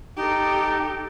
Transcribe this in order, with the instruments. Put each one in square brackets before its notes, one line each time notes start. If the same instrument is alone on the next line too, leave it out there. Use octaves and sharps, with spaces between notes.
[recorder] D#4 [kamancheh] G4 A4